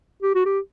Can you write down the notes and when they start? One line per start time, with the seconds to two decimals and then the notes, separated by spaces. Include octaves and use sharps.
0.23 G4
0.35 F#4
0.46 G4